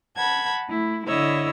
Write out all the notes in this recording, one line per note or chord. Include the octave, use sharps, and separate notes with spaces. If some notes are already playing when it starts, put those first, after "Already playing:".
F#5 A5 B5 G#6
A3 E4
D3 E4 C#5 D#5 E6